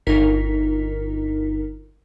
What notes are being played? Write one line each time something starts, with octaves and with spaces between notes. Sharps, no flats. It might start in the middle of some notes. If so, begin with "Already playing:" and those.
G1 D#4 A#4 B6